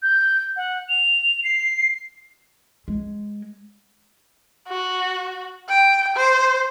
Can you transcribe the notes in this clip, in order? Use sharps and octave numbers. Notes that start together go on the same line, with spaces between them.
G6
F#5
F7
C7
G#3
F#4
G5
C5